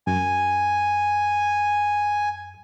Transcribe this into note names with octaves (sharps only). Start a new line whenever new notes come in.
F#2 G#5